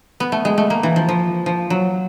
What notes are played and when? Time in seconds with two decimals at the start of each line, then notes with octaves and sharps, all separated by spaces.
0.20 B3
0.32 A3
0.45 G#3
0.58 A3
0.70 A#3
0.83 E3
0.96 F3
1.09 F3
1.46 F3
1.70 F#3